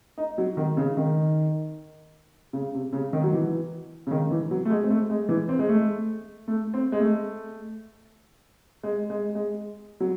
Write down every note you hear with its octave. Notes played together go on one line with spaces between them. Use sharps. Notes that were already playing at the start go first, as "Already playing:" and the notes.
D#4
F#3
D#3
C#3
D#3
C#3
C3
C#3
D#3
F#3
E3
C#3
D#3
E3
F#3
A3
G#3
C4
A3
G#3
E3
C4
G#3
A3
A3
C4
G#3
A3
G#3
G#3
G#3
F#3